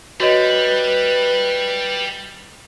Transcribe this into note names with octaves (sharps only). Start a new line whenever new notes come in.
G3 F#4 B4 C#5 D#5